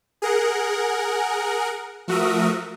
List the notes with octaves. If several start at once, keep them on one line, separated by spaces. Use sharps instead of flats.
G#4 A#4 F#5
F3 A3 F#4 A#4 E5 D#6